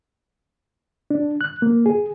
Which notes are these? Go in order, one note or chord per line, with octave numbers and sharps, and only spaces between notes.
D4
F#6
A#3
G#4